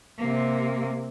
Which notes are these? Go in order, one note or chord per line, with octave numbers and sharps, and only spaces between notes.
C3 A#3